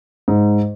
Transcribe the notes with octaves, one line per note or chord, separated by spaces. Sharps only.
G#2